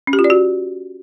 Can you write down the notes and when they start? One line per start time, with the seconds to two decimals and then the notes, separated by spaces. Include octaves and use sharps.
0.07 C#4
0.13 G4
0.19 F4
0.24 D5
0.30 F#4